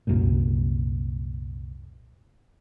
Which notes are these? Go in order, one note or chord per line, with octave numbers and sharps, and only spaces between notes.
C2 F#2 A#2